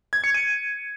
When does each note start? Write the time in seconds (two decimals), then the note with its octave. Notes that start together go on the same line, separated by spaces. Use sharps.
0.13 G#6
0.24 C#7
0.34 D#7